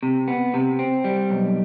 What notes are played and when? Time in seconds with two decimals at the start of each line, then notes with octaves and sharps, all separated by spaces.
0.03 C3
0.28 B3
0.54 C3
0.79 C4
1.04 G3
1.30 B1